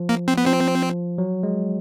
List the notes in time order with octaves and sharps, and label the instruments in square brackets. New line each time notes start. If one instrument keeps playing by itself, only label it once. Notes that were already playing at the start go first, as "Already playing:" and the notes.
Already playing: [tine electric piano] F3
[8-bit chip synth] A#3
C4
B3
[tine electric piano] F3 [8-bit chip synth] C4
[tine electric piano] F#3
G#3